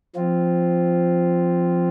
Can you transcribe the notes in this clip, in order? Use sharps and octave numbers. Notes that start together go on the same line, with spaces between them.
F3 C4 F4